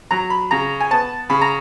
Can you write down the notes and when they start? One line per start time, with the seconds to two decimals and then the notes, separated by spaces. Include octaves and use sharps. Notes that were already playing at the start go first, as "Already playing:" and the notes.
0.11 F#3 A#5
0.30 B5
0.51 C#3 A#5
0.80 G#5
0.91 B3 A5
1.30 C#3 B5
1.41 A#5